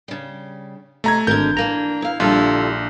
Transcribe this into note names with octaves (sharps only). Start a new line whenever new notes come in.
C#3 G3
F2 C3 G#3 A3 A#5 G#6
G#1 D3 A3 A#4 G6
E3 A#3 D4 A#5
E4 F5
A#1 D3 G3 E4 F4 A4